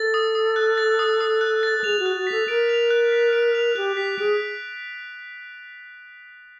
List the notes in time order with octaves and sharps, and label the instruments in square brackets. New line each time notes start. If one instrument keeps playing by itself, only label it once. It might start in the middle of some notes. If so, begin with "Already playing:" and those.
Already playing: [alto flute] A4 [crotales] A6
[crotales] D#6
D#6
F#6
A6
D#6
D#6
F#6
A6
[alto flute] A4
[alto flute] G#4 [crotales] F7
[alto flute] F#4
[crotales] F#6
[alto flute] F#4
[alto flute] A4 [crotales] B6
[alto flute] A#4 [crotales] D7
[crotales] F7
F#6
B6
D7
F7
[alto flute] G4 [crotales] F#6
[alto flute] G4 [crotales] B6
[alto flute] G#4 [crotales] D7